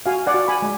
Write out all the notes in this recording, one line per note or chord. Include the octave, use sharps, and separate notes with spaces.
F#4 F5 G#5
D5 F#5
F#4
G#5 B5
G#3